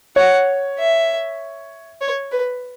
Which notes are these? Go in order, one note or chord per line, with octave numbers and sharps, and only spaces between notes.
C#5 F#5
E5
C#5
B4